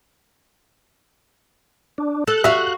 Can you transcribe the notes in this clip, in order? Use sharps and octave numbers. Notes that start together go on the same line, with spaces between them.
D4
A4 F#6
F#4 E5 F5